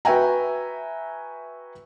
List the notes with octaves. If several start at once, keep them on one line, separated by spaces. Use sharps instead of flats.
F#4 B4 E5 G5 G#5 A#5